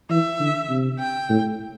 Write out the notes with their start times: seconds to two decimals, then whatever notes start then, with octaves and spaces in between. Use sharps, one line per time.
0.10 E3 E5
0.40 D3
0.69 C3
0.99 G5
1.29 A2